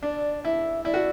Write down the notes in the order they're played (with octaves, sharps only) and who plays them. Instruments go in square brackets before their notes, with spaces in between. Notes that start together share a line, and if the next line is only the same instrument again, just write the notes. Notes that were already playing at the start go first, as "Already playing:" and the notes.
[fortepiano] D4 [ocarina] D5
[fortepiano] E4 [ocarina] E5
[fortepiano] E4 [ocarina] D5
[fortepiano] F#4